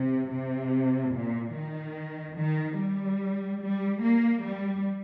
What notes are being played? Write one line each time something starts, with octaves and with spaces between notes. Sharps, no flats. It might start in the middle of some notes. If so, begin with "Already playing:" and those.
Already playing: C3
C3
A#2
D#3
D#3
G3
G3
A#3
G3